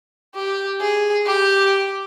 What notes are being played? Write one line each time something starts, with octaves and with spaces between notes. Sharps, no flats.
G4
G#4
G4